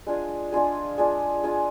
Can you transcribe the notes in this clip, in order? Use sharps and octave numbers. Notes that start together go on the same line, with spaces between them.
G#3 D4 F4 G#4
G#3 D4 F4 G#4
G#3 D4 F4 G#4
G#3 D4 F4 G#4